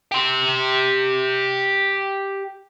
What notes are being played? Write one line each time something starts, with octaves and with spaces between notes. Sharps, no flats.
G4 C6